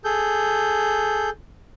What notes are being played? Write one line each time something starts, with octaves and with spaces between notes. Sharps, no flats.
G#4 A4 G6